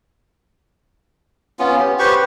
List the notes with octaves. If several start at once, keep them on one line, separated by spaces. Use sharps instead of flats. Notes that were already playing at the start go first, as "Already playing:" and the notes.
B3 C#4 F4
G4
G4 B4 C5 C#6